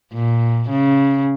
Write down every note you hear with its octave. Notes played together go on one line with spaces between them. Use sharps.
A#2
C#3